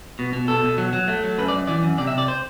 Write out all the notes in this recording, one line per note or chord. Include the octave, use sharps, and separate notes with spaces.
B2
B2
B2 A4
B2
F#3
F#3
A3
F#3
F#2 B4
D5
F#2
E3 D5
F#2
C3 D5
E5
C3
D5
C5